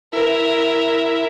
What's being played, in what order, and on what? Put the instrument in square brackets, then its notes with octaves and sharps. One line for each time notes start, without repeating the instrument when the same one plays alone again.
[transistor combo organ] E4 [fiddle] A#4